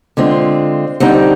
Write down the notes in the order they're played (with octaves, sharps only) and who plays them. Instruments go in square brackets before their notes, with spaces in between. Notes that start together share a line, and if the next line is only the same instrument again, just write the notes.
[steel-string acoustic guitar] D3 G#3 C4 F4
D3 G3 C4 D#4